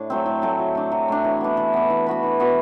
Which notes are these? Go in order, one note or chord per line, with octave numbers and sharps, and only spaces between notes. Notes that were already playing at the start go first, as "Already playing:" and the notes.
Already playing: A2 D4
F#3 A3 C4
A2
F#3 A3 C4
F#3
A3 D4
F#3
A3 D4
E3
B3 D4
E3
B3 D4
E3
B3 F#4 B4
E3
B3 F#4 B4